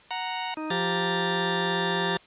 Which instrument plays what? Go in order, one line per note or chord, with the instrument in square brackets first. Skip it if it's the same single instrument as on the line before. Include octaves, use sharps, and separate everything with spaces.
[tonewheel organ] F#5 A#5
D#4
F3 G4 A#5 A6